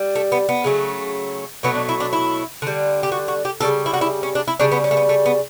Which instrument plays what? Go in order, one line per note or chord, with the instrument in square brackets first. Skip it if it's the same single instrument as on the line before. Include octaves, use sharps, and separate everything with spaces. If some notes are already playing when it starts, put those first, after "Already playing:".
Already playing: [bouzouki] G3
A3
B3
B3
C#3 F#3 A3
B2 F#3 A3 B3
D4
E4
D4
E4
D3 G3
G4
F#4
F#4
G4
C#3 E3 G3 A4
E4
F#4
E4
C#4
D4
E4
C#3 G3 D4
B3
C#4
A3
B3
A3
B3